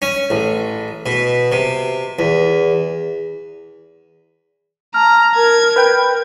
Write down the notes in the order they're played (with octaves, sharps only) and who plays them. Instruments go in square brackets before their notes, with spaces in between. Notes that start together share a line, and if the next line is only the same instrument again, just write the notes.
[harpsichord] C#4
A1
B2
C3
E2
[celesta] A5 F6 [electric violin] A#5
[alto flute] A#4 [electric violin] G#6
[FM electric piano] B4 G5